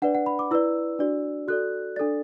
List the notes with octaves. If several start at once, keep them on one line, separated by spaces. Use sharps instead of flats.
D4 B4 D5 F#5
F#5
B5
D6
E4 B4 D5 E6
D4 F#4 D5
F#4 A4 D5 F#6
D4 A4 D5 A6